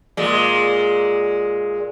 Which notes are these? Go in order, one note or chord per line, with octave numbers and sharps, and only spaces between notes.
A#2 G#3